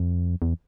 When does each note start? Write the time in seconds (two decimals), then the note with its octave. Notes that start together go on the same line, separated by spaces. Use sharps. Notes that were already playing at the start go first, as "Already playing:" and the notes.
Already playing: F2
0.42 E2